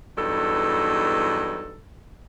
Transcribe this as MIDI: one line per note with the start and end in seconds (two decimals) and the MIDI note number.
0.17 1.81 40
0.17 1.81 43
0.17 1.81 54
0.17 1.81 63
0.17 1.81 69